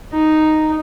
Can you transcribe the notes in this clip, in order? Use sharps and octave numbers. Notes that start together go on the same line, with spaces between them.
D#4